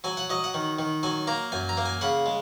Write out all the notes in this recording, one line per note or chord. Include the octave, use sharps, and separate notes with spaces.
F#3 G#5
F#5
F#3 D#5
F#5
D#3
D#3
F#3 G#5
A#3 A#5
F#2 G#5
A#5
A#3
G#5
C#3 F#5
G#3